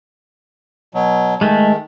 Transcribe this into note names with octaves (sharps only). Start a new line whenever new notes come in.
B2 F#3
D#3 G#3 A3